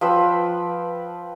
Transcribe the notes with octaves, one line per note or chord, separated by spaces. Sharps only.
F3 B4 G5 E6